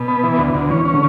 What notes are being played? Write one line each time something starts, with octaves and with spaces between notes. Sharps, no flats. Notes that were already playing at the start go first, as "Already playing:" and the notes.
Already playing: B2
B3
E3
D2
D2
E3 C#4
C#4
D3